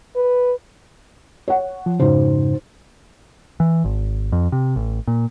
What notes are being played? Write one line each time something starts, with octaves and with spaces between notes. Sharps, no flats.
B4
C#5 F#5
F3
F2 G#2 C#3 D#4 F#4 C5
E3
G#1
F2
C3
A1
A#2